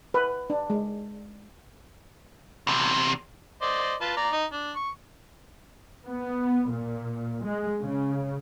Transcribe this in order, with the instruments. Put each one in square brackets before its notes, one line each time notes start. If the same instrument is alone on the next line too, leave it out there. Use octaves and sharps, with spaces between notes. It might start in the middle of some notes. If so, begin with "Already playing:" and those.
[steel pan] B4
D4
G#3
[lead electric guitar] E2 C3
[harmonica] C5 D5 D#5
F4 B4 A5
D5 A#5
D#4
D4
C#6
[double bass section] B3
A#2
G#3
C#3